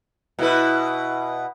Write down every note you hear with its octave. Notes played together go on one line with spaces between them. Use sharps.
B2 E4 B4